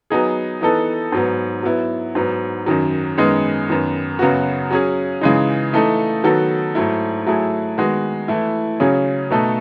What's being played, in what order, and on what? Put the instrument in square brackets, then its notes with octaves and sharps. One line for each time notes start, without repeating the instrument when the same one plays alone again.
[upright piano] F#3 B3 D#4 G#4
E3 B3 D#4 A4
G#2 F#3 B3
F#3 B3 E4
G#2 F#3 B3
F#2 D#3 F#3
F#2 D#3 G#3 B3 D#4
F#2 D#3 F#3 B3
F#2 C#3 F#3 B3 F#4
F#3 C#4 G#4
C#3 E3 G#3 D#4
E3 A3 D#4 A4
D#3 F#3 B3 F#4 A4
G#2 F#3 A3 E4
F#3 A3 E4 G#4
D#3 G#3 B3 F#4
E3 A3 E4
C#3 F#3 C#4 G#4
B2 A3 D#4 A4